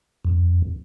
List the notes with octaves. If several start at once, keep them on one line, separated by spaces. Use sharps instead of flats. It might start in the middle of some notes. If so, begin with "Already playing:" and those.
F2